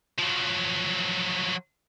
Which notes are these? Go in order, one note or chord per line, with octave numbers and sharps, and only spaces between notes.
F3 F#3